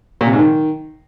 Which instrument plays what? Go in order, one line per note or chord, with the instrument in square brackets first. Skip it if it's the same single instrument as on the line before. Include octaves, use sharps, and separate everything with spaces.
[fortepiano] A#2
C3
G#2
D#3